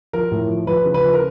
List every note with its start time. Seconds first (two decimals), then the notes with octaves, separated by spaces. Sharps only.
0.13 F3 A#4
0.31 A2
0.49 F3
0.67 F3 B4
0.85 C#3
0.94 B4
1.03 F3
1.14 A#4